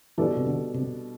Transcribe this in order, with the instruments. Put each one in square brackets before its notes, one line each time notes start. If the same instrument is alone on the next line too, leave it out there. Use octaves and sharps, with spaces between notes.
[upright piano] B2 G3 D4 A4 D5 [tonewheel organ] E3
[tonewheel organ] C3
D3
C3